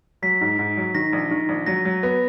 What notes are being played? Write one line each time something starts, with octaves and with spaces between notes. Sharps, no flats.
F#3 B6
G#2
G#2
F#3
D#3 A#6
A#1
D#3
A#1
F#3 A#6
F#3
B3